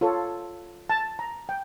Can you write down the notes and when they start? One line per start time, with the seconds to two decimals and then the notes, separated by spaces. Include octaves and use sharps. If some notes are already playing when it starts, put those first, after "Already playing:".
0.01 F4 A4 C#5
0.90 A5
1.19 A#5
1.49 G5